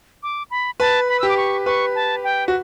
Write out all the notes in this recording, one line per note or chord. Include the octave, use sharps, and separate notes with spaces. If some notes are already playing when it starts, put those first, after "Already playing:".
D6
B5
B4 A5
B5
G4 E6
D6
C#6
B4 C#6
A5
G5
F#4